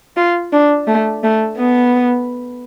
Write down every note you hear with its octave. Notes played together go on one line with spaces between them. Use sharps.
F4
D4
A3
A3
B3